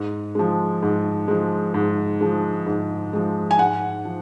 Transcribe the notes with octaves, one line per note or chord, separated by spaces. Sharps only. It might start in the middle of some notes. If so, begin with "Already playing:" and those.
Already playing: G#2
F3 G#3
G#2
F3 G#3
G#2
F3 G#3
G#2
F3 G#3
G#5
G#2 F#5
F3